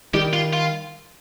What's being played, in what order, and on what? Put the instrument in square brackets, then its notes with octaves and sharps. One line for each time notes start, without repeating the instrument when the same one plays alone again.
[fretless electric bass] D#3 G3 [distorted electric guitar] G4
[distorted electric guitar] F4
F4